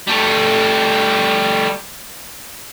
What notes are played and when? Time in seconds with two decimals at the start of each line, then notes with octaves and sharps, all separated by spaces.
0.07 G3 A3